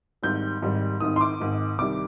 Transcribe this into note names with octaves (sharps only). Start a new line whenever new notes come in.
G#1 G#2 D#3 G3 G6
G#1 G#2 D#3 G3
G#1 G#2 D#3 D#6
C6
D6
G#1 G#2 D#3
C2 C3 D#3 G3 D6